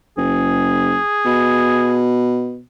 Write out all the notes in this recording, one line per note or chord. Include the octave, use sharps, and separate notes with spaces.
F#1 G#4
B2